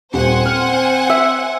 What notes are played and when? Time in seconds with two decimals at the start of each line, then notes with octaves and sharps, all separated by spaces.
0.14 D#1 C4 C5 F#5 G#5
0.46 F6
1.10 E5